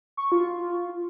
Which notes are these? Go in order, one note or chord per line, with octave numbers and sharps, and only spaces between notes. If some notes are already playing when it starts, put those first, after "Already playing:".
C#6
F4